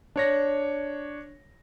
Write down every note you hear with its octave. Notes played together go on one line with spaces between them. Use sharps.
D4 C#5 A#6